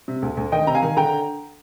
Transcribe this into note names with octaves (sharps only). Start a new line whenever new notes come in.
C3
D2
D2
D#3 D#5 G5
C3 A#5
F5 G#5
D#3
D3 G5 A#5